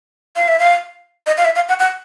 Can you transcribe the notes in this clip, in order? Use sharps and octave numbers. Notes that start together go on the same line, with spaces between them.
F5
E5
F5
D#5
F5
E5
F5
F#5
F#5